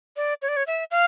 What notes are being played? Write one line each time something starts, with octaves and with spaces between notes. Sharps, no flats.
D5
C#5
D5
C#5
E5
F5